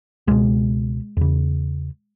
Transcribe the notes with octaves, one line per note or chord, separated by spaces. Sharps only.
C#2 B2 G#3
E2 C#3